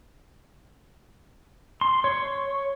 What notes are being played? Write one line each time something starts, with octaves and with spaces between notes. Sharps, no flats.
C6
C#5